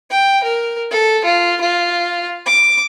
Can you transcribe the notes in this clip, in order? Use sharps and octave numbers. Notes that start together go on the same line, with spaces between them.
G5
A#4
A4
F4
F4
D6